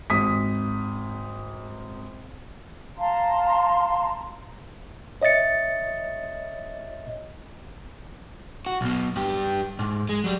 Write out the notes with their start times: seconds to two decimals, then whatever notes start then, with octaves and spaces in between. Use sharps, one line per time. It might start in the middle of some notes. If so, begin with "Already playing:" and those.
0.10 G#1 D#6 B6
2.98 F5 A5 A#5 C6
5.22 C#5 D#5 E5 A6 C#7
8.66 F#4
8.81 B1 B2
9.16 G2 G4
9.79 G#2
10.09 G#3
10.24 F#3 G3